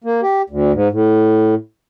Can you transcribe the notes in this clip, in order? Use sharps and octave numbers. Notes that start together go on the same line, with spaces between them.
A#3
G4
D2
G#2
A2